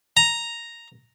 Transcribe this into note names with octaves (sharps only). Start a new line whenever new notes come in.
A#5